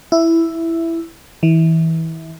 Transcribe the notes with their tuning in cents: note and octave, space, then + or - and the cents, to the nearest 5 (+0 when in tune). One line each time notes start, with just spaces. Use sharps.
E4 +5
E3 -25